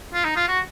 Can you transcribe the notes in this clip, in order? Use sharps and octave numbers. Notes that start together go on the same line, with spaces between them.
F4
D#4
F4
F#4